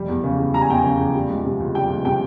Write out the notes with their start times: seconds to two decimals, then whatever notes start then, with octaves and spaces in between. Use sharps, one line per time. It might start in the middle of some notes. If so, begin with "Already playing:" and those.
Already playing: F1 G3
0.08 E2
0.24 C#3
0.39 E2
0.54 G3 A#5
0.62 G#5
0.69 E2 G5
0.78 G#5
0.84 C#3
0.99 E2
1.15 G3
1.29 C#2
1.45 C3
1.60 C#2
1.75 G3 G5
1.90 C#2
2.05 C3 G5